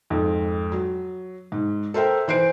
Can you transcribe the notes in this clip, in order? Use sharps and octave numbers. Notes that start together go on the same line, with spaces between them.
F2 G#2
F#3
G#2
A4 A#4 C5 E5 G5
E3 C5 C7 D7